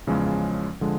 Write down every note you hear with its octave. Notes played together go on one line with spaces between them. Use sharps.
E2 C#3 F3 G#3 C#4
D3 F3 G#3